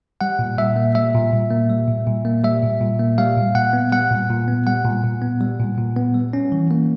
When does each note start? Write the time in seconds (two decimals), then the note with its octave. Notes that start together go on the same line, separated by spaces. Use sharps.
0.21 G3 F#5
0.39 A#2
0.58 A#2 E5
0.76 A#3
0.95 G3 E5
1.14 A#2
1.33 A#2
1.51 A#3
1.70 G3
1.88 A#2
2.07 A#2
2.25 A#3
2.43 G3 E5
2.62 A#2
2.81 A#2
2.99 A#3
3.18 G3 F5
3.37 A#2
3.55 A#2 F#5
3.73 B3
3.92 G3 F#5
4.11 A#2
4.30 A#2
4.48 B3
4.67 G3 F#5
4.85 A#2
5.04 A#2
5.22 B3
5.41 G3
5.59 A#2
5.78 A#2
5.96 B3
6.14 G3
6.33 C#4
6.52 E3
6.71 A#3